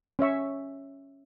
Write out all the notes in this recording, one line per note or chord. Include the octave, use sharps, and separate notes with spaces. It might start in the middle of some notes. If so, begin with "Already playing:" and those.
C#4 C#5 E5 C#6